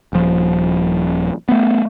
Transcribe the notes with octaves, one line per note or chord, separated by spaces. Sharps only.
D#1 F3
A3 B3